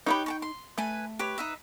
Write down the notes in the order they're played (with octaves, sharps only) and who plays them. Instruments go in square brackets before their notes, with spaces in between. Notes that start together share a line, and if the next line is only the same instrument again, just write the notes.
[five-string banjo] D#4 A#5 B5 [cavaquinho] G4 B4 C#5
[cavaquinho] G5 A5 C#6
C6
[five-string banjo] A3 [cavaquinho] B4 G#5
[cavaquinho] G4 B4 C#5
D#4 B4 E5